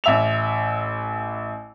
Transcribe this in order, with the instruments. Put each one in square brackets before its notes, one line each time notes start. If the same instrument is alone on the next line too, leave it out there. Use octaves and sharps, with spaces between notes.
[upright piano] A1 E5 F7